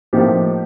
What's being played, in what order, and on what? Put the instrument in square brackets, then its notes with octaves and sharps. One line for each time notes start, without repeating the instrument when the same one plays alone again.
[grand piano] A2 F3 A#3 D#4 G4